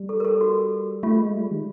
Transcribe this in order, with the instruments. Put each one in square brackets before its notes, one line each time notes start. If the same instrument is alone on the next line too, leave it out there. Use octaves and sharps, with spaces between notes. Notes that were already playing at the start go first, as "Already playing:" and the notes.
Already playing: [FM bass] G3
[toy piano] A4
A#4
A4
F#4
[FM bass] A3 [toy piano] F4
[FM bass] G#3
G3
D#3